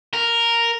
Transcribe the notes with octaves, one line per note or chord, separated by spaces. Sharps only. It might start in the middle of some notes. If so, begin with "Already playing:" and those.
A#4